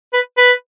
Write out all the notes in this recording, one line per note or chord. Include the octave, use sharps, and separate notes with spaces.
B4
B4